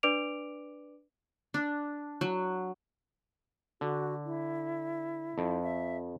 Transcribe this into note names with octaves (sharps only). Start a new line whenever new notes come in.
D4 B4 D5 D6 D7 F7
D4
F#3
D3 F#4
E4
F2
E5